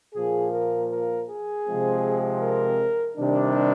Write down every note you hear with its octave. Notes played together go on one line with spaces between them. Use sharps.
A#2 F3 A#3 G#4
A#4
A#4
G#4
C3 F3 G#3 C4
A#4
C3 D#3 G3 D4